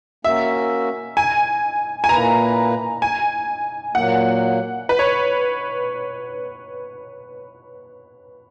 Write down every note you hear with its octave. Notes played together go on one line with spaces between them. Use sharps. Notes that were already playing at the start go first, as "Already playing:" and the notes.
A#3 C#4 F#4 A#4 E5
G#5
G#5
A#2 A#3 E4 B4 A#5
G#5
A#2 F#3 A#3 F#5
B4
C#5